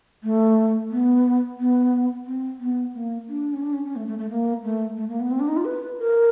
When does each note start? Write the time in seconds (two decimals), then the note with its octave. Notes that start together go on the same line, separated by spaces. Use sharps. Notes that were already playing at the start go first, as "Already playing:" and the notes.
0.23 A3
0.91 B3
1.59 B3
2.26 C4
2.60 B3
2.94 A#3
3.28 D4
3.53 C#4
3.62 D4
3.73 C#4
3.85 C#4
3.96 A3
4.07 A3
4.18 A3
4.30 A#3
4.63 A3
4.97 A3
5.09 A#3
5.20 B3
5.31 C4
5.40 D4
5.48 D#4
5.57 F4
5.65 B4
5.99 A#4